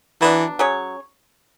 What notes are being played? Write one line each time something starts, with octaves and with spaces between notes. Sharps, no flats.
E3 F#3 B3 D4
F#3 C#4 G#4 C#5